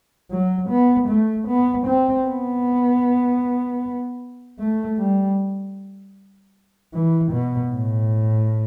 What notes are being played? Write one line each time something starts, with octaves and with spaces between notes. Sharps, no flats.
F#3
B3
A3
B3
C4
B3
A3
G3
E3
B2
A2